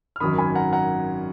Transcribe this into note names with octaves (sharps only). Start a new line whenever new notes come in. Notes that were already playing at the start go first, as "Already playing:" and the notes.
F6
G#1 F#2 D#3 F#3 B5 D#6
G#5 B5
F#5 A#5
F#5 A#5